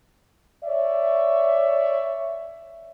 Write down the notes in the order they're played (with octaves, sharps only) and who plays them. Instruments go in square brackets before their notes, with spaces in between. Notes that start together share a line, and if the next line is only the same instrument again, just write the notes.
[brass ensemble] C#5 D5 E5